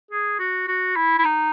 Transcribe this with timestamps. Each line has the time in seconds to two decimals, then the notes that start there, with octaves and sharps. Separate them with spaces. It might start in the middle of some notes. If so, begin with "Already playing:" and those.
0.11 G#4
0.39 F#4
0.68 F#4
0.96 E4
1.19 E4
1.25 D#4